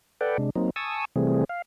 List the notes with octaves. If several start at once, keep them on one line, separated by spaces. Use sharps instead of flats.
A4 B4 D5 F#5 G5
C3 G#3 D4
F#3 A#3 C4 D#4
G#5 A5 C#6 D#6 E6
C3 E3 G3 A3 C4 G#4
F5